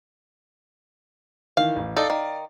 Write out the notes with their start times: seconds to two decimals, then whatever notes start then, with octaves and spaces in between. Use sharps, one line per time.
1.57 D#3 E3 F5
1.76 A1
1.96 D#4 A4 D5 F5
2.10 D#3